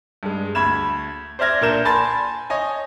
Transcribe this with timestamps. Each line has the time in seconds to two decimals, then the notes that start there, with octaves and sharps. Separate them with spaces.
0.23 G2 G#3
0.55 D2 B5 G#6 E7
1.39 C5 D5 E5 F6 G#6 A#6
1.61 A#2 D4 A#4 G6 E7
1.85 G#5 A5 B5 C6 A6
2.50 C#5 D#5 G#5